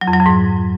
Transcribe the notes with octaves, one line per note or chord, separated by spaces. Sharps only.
F#3
F2
F#3
F2
G#2